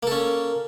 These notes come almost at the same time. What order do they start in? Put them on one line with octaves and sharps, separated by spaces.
A#3 A4 C#4